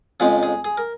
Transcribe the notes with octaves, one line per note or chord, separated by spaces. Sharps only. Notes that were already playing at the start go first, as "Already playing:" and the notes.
F2 C#3 F3 G#3 G#4
G#4
G#4
A#4